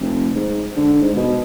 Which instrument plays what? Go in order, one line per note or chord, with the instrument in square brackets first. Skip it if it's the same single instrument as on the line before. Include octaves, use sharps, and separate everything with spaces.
[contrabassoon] F1
G#2
D3
G#2
B2